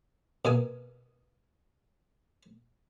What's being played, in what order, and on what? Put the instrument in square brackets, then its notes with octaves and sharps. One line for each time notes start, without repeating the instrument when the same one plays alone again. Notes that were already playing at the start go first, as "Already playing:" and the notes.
[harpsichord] B2 A#3 G#5 D#6